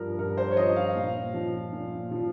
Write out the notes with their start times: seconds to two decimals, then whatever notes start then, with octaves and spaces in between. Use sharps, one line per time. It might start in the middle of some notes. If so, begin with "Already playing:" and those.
Already playing: G2 F3 A#4
0.18 G2 A#4
0.37 C5
0.51 C#5
0.57 F3 D#5
0.76 F5
0.95 A#2
1.34 F3
1.73 A#2
2.11 F3